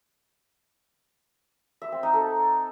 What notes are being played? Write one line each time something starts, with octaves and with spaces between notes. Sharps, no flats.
E5
C4
D#4
A4